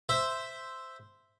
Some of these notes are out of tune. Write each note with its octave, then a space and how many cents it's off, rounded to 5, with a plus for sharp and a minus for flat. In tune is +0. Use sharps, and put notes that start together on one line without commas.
C5 -5 E5 +0